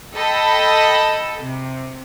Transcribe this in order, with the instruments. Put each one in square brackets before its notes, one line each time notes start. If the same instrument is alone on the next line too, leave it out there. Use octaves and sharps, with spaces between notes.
[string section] A4 D#5 G5 A5 B5
C3